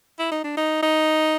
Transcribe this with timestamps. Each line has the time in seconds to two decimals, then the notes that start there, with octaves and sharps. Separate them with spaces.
0.19 E4
0.32 D#4
0.44 D4
0.57 D#4
0.83 D#4